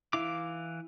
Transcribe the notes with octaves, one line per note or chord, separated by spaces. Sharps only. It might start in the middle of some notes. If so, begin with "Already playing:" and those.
E3 E4 F5 D6